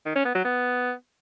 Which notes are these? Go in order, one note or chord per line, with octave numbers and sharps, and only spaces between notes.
D#3
C#4
B3
F#3
B3